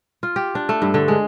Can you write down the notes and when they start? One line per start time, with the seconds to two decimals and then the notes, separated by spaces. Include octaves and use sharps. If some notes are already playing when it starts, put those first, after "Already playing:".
0.23 F4
0.36 G4
0.55 D4
0.69 A3
0.82 G2
0.94 D3
1.08 G#3